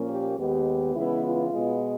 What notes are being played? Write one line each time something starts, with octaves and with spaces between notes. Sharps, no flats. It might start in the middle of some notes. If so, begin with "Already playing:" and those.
Already playing: A#2 F3 A#3 C#4
G4
D#2 D#3 G#3 B3 G4
C#3 E3 G#3 B3 E4
F4
B2 G#3 B3